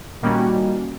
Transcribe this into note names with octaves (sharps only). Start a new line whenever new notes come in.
A#2 D#3 G3 A#3 C#4 F#4